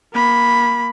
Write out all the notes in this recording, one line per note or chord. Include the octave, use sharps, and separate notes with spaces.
A#3 B5